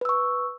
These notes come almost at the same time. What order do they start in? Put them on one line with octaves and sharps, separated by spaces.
B4 E6 C#6